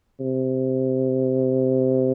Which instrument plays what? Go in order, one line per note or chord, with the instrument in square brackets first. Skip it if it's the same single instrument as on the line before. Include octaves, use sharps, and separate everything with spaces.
[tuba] C3